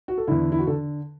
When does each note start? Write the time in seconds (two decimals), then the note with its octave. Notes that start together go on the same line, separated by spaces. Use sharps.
0.08 F#4
0.18 A4
0.27 E2 D3 E4
0.52 E4
0.59 F#4
0.67 D3 A4